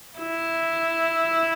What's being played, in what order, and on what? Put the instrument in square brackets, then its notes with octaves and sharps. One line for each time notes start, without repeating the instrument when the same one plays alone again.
[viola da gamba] E4